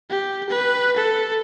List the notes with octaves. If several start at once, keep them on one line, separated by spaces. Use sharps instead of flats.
G4
B4
A4